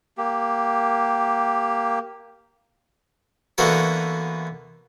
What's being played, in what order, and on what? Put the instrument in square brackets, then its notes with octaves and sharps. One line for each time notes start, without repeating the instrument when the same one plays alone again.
[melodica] A#3 G4
[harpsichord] D3 E3 A#3 B3 F#4 A4